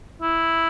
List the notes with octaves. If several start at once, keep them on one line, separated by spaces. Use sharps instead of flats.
E4